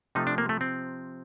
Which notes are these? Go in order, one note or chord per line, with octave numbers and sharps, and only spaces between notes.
C3 F3 A3 D#4
D4
A#3
A3
C4